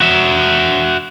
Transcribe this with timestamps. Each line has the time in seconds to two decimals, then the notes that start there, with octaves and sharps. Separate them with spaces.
0.01 F#4 E5